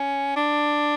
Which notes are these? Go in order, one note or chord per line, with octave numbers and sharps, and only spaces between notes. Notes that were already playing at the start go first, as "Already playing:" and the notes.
Already playing: C#4
D4